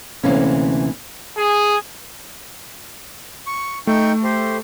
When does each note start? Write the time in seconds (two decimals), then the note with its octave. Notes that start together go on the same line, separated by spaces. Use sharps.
0.23 D2 C3 E3 A#3 C#4
1.38 G#4
3.47 C#6
3.87 A3 D#4 G5 C#6
4.23 G4 C5